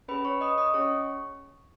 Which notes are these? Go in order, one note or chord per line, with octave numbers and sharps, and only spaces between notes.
C#4 G#4 B4 B5
C#5 C#6
D#5 D#6
D#5 D#6
C#4 G#4 C#5 C#6